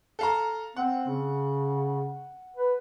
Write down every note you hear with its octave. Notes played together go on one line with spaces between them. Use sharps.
A4 F5 A#5
C4 F#5
C#3
B4